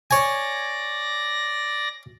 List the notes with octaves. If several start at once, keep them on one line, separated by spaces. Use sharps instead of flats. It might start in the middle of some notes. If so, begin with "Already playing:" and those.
C#5 D5 G#5 A#6